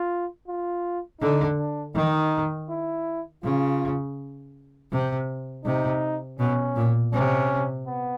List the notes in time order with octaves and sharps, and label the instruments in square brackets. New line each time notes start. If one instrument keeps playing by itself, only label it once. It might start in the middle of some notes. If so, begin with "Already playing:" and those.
Already playing: [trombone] F4
F4
[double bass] D3 [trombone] D#4
[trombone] D4
[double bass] D#3 [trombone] D#4
[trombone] E4
[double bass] C#3 [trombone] F4
[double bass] C3
[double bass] C3 [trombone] D#4
[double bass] B2 [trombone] C#4
[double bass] A#2
[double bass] C3 [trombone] C#4
[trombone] B3